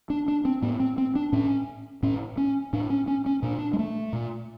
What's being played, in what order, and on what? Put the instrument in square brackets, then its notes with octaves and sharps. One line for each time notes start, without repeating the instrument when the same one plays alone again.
[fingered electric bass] D4
D4
C4
A2 B3
C4
C4
D4
A2 C#4
A2 C#4
C#4
A2 D4
C#4
C#4
C#4
A#2 D4
D4
G#3
A3
A#2